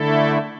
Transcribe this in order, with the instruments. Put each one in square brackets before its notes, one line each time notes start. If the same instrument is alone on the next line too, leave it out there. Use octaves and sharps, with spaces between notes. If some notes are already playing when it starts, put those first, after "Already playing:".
Already playing: [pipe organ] D3 A3 E4 A4